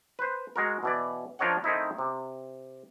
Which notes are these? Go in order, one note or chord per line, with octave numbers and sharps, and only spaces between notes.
B4 C5
G#3 F#4 A#4
B2 E3 D5
F3 D4 A#4 C#5 D#5 F#5
D#3 A3 C4 D#4 E4
C3